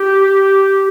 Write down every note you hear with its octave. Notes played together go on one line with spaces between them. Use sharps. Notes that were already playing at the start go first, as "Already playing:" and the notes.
Already playing: G4